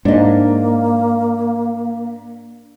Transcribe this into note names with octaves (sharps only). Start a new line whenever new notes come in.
G#2 A#3 D4 D#5